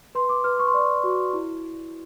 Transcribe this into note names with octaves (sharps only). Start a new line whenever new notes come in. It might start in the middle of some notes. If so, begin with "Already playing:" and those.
B4 C6
D6
B4 F6
C#6
C6
D5 C#6
F#4
E4